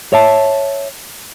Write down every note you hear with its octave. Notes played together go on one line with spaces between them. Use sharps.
C#5 E5 A5